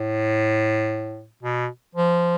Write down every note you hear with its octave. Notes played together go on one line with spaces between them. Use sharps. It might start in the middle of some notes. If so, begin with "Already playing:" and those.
Already playing: A2
B2
F3